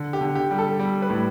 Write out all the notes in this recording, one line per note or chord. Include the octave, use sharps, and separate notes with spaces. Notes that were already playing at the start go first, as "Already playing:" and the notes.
Already playing: D3
G4
D3
G4
G3
A4
G3
B4
A2